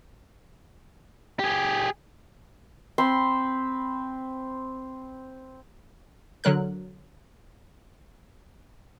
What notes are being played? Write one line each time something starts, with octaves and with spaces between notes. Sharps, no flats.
G4 G#4
C4 B5 C6
D3 F#3 A#4 F#6